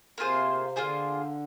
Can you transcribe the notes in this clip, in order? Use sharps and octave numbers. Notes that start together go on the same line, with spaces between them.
C3 A#3 F4 G#4 C5
D3 A#3 F4 G#4 C5